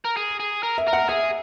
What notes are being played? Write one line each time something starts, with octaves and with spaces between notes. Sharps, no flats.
A#4
G#4
G#4
A#4
E5
A#4
F#5
G#4 E5